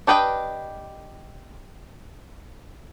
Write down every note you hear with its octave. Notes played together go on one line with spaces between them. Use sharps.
D4 G4 B4 D#5 G5